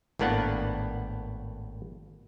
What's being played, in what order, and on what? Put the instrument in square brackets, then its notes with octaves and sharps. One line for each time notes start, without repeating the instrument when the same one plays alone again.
[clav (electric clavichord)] G#1 A2 A#3 B3 D4 F#5